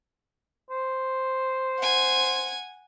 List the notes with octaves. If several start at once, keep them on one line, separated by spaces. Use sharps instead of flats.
C5
F#5 G#5